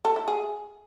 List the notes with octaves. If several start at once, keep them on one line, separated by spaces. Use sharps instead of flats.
A4
E4
G#4